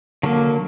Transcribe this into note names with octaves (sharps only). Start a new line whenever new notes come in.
D3 F#3 A#3